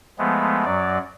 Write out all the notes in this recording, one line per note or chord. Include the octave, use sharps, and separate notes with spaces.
F3 G#3 A3 B3
F#2 F#3 D5